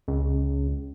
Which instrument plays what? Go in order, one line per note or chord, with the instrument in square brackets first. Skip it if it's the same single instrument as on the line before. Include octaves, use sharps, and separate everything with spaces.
[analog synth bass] C#2